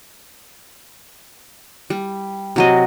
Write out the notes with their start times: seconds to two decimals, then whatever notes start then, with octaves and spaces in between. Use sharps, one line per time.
1.90 G3
2.56 C3 F#3 D#5